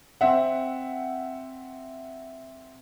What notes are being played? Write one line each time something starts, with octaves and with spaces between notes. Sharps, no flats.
C4 E5 F#5